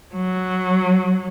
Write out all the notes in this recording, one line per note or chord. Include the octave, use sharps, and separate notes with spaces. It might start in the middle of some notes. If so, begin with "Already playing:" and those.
F#3